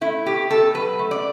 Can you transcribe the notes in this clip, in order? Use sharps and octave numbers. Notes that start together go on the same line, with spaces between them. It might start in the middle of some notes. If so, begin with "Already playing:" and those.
A3 E4
B2 G4
B2 A4
F#3 B4
A3
D5